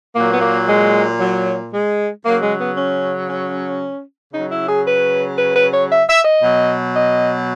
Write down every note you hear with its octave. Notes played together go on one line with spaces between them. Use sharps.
A#2 F#3 A#3
B3
A#3
G#3
F#3
G#3
C#3 F#3 A#3
G#3
B3
C#4
C#4
C#3 F#3 D#4
E4
G#4
B4
B4
B4
C#5
E5
E5
D#5
B2 F#3
D#5